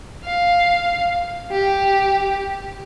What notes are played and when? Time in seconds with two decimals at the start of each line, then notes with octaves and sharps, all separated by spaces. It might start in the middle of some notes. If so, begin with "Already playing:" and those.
0.25 F5
1.51 G4